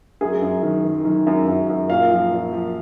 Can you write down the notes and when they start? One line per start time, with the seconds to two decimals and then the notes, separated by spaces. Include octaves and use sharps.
0.21 F#2 G#4
0.42 F#2
0.63 D#3
0.85 D#3
1.05 D#3
1.27 F#2
1.48 F#2
1.69 F#2
1.90 A#2 F5
2.11 F3
2.33 A#2
2.53 F3